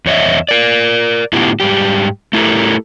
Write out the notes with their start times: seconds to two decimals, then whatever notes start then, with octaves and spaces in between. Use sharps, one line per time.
0.06 E2 C#5 D#5 E5
0.49 A#4 D5
1.33 A2 D3 B3 E4 F4 G4
1.60 G#2 G3 G4
2.33 A3 E4 G4 A4 A#4